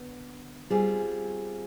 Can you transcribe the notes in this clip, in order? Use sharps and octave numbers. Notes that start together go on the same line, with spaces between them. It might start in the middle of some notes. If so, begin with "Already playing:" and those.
Already playing: D3 B3
G3 C4 F4 G#4